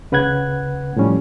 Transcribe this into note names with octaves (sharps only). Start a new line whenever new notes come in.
C#2 C#3 B4 F#5 F#6 G#6
A2 F3 G3 C#4